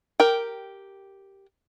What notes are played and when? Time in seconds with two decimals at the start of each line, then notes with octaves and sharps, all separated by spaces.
0.20 G4 A#4 G5